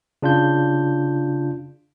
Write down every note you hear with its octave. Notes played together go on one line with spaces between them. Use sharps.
C#3 D4 F4 G6